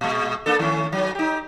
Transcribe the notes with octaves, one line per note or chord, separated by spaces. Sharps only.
A#2 G#3
A#3 D4 A4
D#3 A3 C#4
G#2 F#3
D#4 G4